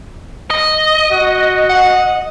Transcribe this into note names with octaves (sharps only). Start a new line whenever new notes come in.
D#5
F#4
F#5